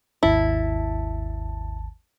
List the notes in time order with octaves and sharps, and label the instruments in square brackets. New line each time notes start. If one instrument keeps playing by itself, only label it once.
[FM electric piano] G#1 D#2 A5 [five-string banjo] E4